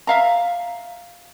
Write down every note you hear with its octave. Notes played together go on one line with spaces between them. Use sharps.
E5 F5 A#5